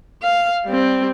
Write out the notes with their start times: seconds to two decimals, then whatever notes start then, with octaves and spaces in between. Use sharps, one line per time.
0.22 F5
0.66 G3 C4